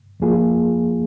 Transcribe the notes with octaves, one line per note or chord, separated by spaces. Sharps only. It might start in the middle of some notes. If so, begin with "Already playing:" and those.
F2 F3 A#3 F4 G#4